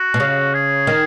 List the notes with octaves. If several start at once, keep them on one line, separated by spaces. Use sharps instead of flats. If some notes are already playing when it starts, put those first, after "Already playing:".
Already playing: F#4
B2
C#3
G#4
D#3